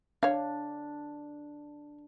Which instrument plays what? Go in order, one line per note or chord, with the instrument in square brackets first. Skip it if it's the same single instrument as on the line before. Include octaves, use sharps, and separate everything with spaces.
[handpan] D4 [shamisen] C#5 F5